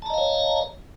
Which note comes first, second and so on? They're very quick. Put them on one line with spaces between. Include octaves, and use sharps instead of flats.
A5 A#5 D#5 F5 C#5